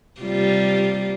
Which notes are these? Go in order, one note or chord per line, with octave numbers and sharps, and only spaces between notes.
C3 G3 F4